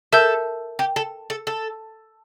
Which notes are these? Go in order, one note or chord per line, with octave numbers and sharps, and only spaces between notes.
A4 A#4 E5 A5 E6 G6
G4
A4
A4
A4